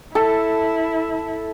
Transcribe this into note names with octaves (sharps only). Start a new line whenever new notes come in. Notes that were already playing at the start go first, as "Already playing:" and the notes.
E4 A4